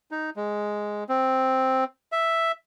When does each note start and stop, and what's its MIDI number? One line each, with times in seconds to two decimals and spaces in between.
0.11 0.30 63
0.36 1.04 56
1.09 1.84 60
2.12 2.52 76